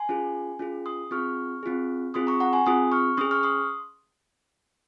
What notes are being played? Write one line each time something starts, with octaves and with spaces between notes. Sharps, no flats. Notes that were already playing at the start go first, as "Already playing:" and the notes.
Already playing: G#5 C6
C#4 F4 G#4
C#4 F4 G#4
C6 D#6
C4 F4 G#4 C#6 F6
C4 F4 G#4
C4 F4 G#4 C6 D#6
A#5 C#6
F#5 A#5
G#5 C6
C4 F4 G#4 C6 D#6
C#6 F6
C#4 G#4 C6 D#6
C#6 F6
C6 D#6